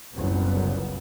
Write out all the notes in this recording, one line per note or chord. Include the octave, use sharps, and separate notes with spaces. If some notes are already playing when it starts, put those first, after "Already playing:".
F#1 C2 F#2 A#2 C#3 B3